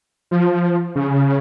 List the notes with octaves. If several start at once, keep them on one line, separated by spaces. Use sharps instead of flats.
F3
C#3